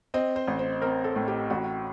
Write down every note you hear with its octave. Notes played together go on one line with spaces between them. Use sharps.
C4 D#5
C5
A1
C5
C4 A#4
A4
A2
G4
A1 F#4